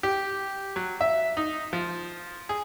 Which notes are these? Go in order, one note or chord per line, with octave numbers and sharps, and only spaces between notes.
G4
F#3
E5
D#4
F3
G#4